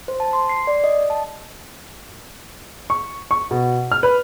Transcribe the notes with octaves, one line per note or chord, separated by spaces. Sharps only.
C5
A5
C6
C7
D5
D#5
A5
C#6
C#6
B2
F6
B4